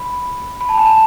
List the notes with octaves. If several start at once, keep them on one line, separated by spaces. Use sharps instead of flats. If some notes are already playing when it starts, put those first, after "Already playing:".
Already playing: B5
B5
A5
G#5
A5